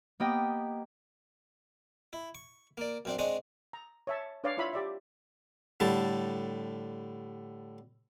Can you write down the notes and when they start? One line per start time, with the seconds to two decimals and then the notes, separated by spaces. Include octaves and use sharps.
0.20 A#3 B3 G4 D#5 G5
2.13 E4
2.35 C#6
2.78 A#3 D5
3.05 F#2 C4 D4
3.19 G#3 C4 D4 C#6 D#6
3.73 A#5
4.07 C#5 E5 A5
4.44 D4 B4 C#5 D5 F5
4.57 E4 F4 C#5 E5 B5
4.73 G4 D5 E5
5.80 A2 D3 G3 A5